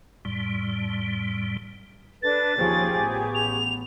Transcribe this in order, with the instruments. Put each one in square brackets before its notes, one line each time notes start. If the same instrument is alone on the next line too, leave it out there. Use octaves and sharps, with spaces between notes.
[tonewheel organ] F2 A2 G3
[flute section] D4 A4 B4 [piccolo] A6
[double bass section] D#2 C#3 F3 [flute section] G4 G#4 C#6
[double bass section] A1 B3
[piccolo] F7